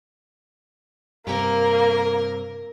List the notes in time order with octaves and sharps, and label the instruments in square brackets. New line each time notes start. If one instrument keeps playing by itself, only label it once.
[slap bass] G2 C3 [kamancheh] A#3 [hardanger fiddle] A#4